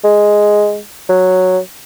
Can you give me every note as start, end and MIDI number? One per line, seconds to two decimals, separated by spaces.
0.04 0.78 56
1.09 1.59 54